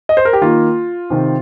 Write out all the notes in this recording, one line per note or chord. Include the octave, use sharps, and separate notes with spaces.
D#5
C5
A#4
G4
D#3 A#3 F4
C3 D#3 C4